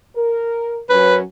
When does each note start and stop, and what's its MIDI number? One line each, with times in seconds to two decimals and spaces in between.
0.15 0.80 70
0.90 1.21 42
0.90 1.21 54
0.90 1.21 61
0.90 1.17 71